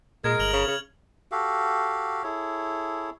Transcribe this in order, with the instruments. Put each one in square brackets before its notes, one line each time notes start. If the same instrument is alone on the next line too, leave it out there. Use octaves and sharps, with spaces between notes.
[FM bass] A#2 [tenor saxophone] G#3 [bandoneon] A#4 [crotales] G#6
[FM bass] G1 [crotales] F6 F7 F#7
[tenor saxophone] C#3
C#3
[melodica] F#4 G4 A4 F5
E4 G#4 A4 C#5